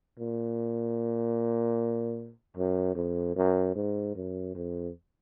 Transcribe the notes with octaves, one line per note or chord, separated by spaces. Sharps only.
A#2
F#2
F2
F#2
G#2
F#2
F2